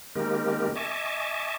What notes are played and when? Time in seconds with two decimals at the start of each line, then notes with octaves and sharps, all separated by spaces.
0.15 D#3 G#3 A#3 C4 G4 A#4
0.75 D#5 E5 G#5 A5 C#6 D6